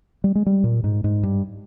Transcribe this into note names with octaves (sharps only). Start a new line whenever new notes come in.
G3
G#3
G3
A#2
G#2
G#2
G2